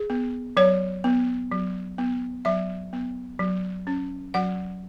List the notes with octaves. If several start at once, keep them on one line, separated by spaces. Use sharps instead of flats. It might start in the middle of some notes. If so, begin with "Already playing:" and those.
Already playing: G#4
B3
F#3 C#5
B3
F#3
B3
F#3 E5
B3
F#3
C#4
F#3 F#5